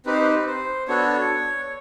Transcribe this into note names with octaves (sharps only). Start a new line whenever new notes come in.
C4 D#4 G4 B4
C5
B4
C5
B3 D4 F#4 A4 C#5